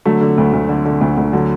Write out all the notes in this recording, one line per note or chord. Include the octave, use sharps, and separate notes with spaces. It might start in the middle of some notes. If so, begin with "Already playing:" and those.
D3 F#3 A3
D3
D2
D2
D3
D3
D2
D2
D3 F#3